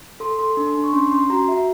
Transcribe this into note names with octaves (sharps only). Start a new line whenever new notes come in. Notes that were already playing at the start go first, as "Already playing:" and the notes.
A4 C6
A4 C6
D4
D4
C#6
C#4 C6
C#4 C6
F#4 A#5
F#4 E5